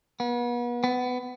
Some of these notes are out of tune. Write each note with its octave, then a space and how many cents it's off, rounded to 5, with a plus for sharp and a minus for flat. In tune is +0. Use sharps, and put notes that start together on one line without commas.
B3 -35
B3 +20